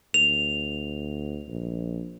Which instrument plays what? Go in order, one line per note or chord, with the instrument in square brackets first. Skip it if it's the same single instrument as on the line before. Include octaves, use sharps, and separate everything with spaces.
[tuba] D2 [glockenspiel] F7
[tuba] A#1